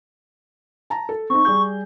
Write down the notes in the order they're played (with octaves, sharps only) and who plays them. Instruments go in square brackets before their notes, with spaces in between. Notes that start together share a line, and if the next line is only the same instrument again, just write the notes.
[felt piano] A5 A#5
A4
[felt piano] C4 D#4 [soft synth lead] C#6
[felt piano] G3 G#4 G6